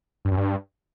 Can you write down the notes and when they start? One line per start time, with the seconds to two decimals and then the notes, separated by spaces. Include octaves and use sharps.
0.25 G2
0.31 F#2
0.37 G2